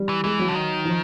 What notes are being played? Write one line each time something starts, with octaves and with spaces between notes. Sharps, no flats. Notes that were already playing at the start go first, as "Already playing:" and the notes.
Already playing: G3
E3
E3 G#3
F#3
D3
D#3
F3